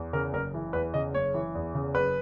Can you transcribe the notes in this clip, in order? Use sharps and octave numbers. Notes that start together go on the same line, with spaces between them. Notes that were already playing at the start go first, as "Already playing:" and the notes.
Already playing: E2
C#3 A#4
F#1 A#4
E3
E2 B4
C#3 D#5
F#1 C#5
E3
E2
C#3
F#1 B4